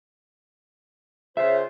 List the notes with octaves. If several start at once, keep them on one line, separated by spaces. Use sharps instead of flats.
C#2 F4 C5 E5